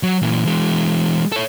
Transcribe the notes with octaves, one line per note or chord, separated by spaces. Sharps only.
F#3
A#2 E3
E3 G#3
A4 C#5